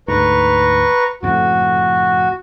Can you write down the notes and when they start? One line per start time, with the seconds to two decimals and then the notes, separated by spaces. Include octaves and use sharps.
0.08 D2 G#2 B4 A#5 C#6
1.23 F#1 F2 A2 F#4